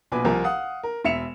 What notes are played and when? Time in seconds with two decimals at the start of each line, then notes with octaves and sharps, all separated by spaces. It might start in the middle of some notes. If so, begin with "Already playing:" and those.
0.12 A#1 B2 B4 G#5 D6
0.25 C2 F3 A#4 G#5
0.44 F5 F#5 D#6
0.83 A#4
1.05 E1 E5 C#7 E7 F7